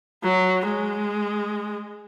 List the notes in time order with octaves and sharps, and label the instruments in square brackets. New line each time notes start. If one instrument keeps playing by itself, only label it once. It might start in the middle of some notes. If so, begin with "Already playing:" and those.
[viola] F#3
G#3